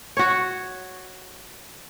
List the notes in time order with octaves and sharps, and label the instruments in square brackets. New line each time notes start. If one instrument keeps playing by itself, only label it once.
[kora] F#4 C#5